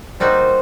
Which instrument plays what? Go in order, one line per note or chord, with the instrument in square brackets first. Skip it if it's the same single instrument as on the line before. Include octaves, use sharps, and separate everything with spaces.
[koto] G3 A#3 D#4 F#4 [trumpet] C5